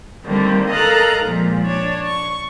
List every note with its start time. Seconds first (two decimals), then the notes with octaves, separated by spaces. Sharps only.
0.25 D3 D#3 G3 A3 A#3 C4
0.71 A4 A#4 D#5 F5 A#5 F#6
1.23 A#2 F3 G#3
1.62 D4 C#5
2.05 C#6